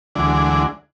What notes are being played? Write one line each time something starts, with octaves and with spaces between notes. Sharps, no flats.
D2 D3 E3 F#3 G#3 D4